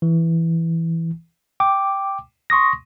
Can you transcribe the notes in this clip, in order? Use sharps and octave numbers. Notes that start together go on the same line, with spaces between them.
E3
G5 D6
C6 C#6 D#6 A#6